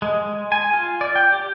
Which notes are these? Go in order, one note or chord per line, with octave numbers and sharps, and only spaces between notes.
G#3
G#5
F4
D5
G5
G4